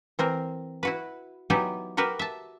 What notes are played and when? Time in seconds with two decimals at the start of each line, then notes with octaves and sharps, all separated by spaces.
0.19 E3 C4 A#4
0.83 E4 F#4 B4
1.50 F#3 B3 D#4 E4 G4 G#5
1.97 F#4 G4 A#4 B4
2.19 E5 A5